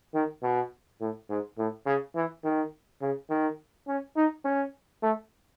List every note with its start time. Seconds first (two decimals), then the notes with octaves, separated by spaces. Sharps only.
0.14 D#3
0.43 B2
1.01 A2
1.29 G#2
1.58 A2
1.86 C#3
2.15 E3
2.44 D#3
3.02 C#3
3.30 D#3
3.88 C#4
4.16 D#4
4.45 C#4
5.03 A3